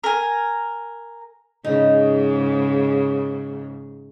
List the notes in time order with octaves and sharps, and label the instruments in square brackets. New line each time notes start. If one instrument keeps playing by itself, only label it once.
[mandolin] A#4 G#5
[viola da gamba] G#2 C#3 [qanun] D#4